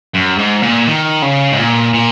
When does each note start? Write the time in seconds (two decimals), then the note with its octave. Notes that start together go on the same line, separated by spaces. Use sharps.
0.15 F#2
0.39 G#2
0.62 A#2
0.87 D#3
1.22 C#3
1.52 G#2
1.58 A#2
1.94 A#2